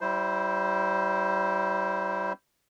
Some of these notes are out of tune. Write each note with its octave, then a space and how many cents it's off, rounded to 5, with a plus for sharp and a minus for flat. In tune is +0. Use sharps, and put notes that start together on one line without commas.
G3 -30 E4 +0 C5 +0